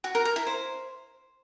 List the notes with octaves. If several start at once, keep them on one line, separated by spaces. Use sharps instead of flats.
F#4
A#4
A#4
E4
C5